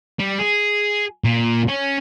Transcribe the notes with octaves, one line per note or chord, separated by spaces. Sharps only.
G3
G#4
A#2
C#4